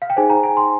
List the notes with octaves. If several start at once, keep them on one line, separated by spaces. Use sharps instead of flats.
F5
G5
D#4 G#4 C5 G#5
A#5
G#5
C6